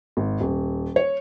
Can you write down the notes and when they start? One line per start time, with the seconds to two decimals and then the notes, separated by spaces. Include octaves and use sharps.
0.17 G#1
0.41 D#1
0.96 C#5